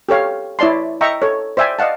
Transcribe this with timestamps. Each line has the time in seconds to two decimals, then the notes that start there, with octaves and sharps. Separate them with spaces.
0.09 G4 A4 C#5 F5
0.59 E4 C#5 D5 A5 C6
1.01 D#5 E5 G5 A#5 C#6
1.22 A4 C#5
1.57 C5 D5 E5 G5 G#5
1.79 D5 D#5 F5 F#5 A5